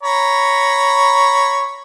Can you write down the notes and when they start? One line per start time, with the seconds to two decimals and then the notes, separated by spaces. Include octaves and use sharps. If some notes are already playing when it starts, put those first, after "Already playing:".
0.03 C#5 A#5 B5